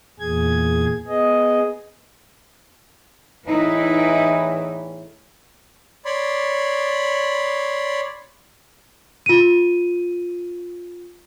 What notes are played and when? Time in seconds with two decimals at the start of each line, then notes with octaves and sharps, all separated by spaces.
0.20 E2 A#2 G#4 G#6
1.07 B3 G#4 D#5
3.47 E2 A2 E3 D#4 E4 B4
6.05 C#5 D5 B5 C6
9.26 F4 D#7